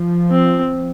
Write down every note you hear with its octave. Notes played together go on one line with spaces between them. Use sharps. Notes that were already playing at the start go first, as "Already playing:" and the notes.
Already playing: F3
C4